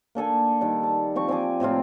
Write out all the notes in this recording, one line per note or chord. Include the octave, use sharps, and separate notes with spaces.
A#3 D4 A4 G#5
D#3 G3 D4
A5
F3 C4 C#6
C4 D5 G#5 D6
A2 C3 C4 F4